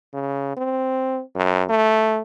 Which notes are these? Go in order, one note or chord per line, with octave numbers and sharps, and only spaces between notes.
C#3
C4
F#2
A3